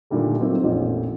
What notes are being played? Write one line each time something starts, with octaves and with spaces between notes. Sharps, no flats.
A#2 D3 D#3 G3 A3
D#3 F#3 A#3 C4 D#4 F4
A1 F2 A#2 D#4